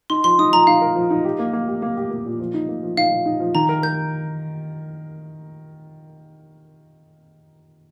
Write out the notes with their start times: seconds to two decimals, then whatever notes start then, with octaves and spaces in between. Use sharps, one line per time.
0.10 D#4 C6
0.24 F3 C6
0.39 D#4 D#6
0.53 F3 A#5
0.67 D#4 F5
0.81 A#4
0.96 F3
1.10 D#4
1.25 G4
1.39 A#3
1.53 A#3
1.68 G4
1.82 A#3
1.97 G4
2.11 A#3
2.25 A#2
2.40 F3
2.54 D#4
2.68 A#3
2.83 F3
2.97 D#4 F5
3.12 F3
3.26 D#4
3.40 F3
3.55 D#3 A#5
3.69 A#4
3.83 A#4 G6